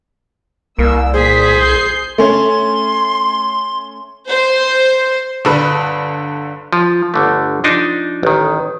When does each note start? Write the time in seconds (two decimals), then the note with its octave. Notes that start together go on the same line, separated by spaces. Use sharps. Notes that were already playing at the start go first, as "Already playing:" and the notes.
0.79 C2 A#3 E6
1.13 A#2 G#4 C5 B6
1.59 G6 C7
2.18 A3 C#4 C6
4.28 C5
5.45 G1 D3 B4
6.73 F3
7.14 G1 D3 A3
7.64 F3 D4 D#4
8.23 A1 D#3